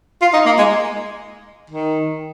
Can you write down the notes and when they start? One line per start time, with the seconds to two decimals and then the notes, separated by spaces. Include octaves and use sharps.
0.22 F4
0.33 D#4
0.46 A#3
0.58 G#3
1.70 D#3